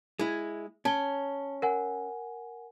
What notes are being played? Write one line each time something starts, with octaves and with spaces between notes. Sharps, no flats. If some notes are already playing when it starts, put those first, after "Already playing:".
G#3 E4
C#4 A5 G7
A#4 F#5 G#5